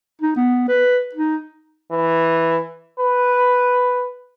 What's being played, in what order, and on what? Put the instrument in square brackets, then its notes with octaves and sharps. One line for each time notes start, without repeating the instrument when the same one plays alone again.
[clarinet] D#4
B3
B4
D#4
[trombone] E3
B4